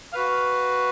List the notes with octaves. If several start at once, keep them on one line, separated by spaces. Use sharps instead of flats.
F#4 B4 F5